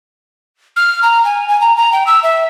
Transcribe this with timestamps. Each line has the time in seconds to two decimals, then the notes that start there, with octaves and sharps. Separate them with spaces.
0.76 F6
1.03 A#5
1.25 G#5
1.48 G#5
1.61 A#5
1.77 A#5
1.92 G5
2.07 E6
2.23 E5